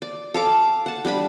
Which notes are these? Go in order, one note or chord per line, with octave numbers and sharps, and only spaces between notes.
D5
A4 F5 D6
F#5 A5
G3 D4 D5 B5